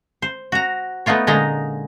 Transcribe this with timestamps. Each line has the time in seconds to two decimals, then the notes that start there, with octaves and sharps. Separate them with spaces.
0.22 C5
0.52 F#4 A#5
1.06 A3 B3 D#4 F4 C#5
1.27 A#2 D3 G#3 C#4 D#4 A#5